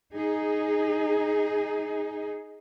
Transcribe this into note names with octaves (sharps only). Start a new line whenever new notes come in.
D#4 G#4